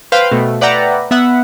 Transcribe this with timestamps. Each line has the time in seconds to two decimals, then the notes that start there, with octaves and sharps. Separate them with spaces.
0.12 B4 C5 F5 G5
0.31 B2 A3
0.61 B4 D5 E5 F#5 G5 A#5
1.11 B3 E5 F#5